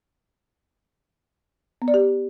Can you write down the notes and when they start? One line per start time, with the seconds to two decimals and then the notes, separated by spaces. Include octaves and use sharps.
1.82 B3
1.88 D5
1.94 G4